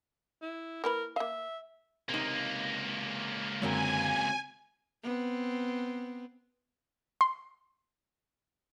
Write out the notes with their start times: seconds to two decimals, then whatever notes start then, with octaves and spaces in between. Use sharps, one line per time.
0.42 E4
0.84 A#3 E4 A#4 B4
1.16 A#3 E5 F5
2.09 C#2 C3 A#3 D#4
3.62 F#2 D3 F#3 G#3 C4 A#4 G#5
5.04 B3 C4
7.21 C6